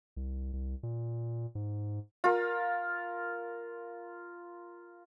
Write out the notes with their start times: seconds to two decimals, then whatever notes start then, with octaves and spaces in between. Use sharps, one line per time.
0.17 C2
0.53 C2
0.83 A#2
1.55 G#2
2.24 F4 A#4